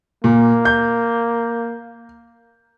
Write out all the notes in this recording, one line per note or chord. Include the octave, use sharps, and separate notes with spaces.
A#2 A#3
G6